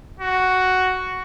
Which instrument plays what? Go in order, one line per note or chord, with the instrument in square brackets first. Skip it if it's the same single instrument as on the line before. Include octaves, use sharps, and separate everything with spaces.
[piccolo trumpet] F#4